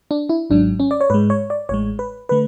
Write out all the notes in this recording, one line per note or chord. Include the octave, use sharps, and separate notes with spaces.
D4
E4
G#1 G#2 F#3 D4
C#4
D5
C#5
G#2 G#3 B4
C#5
D5
A1 A2 G#3 C#5
B4
D3 A3 B4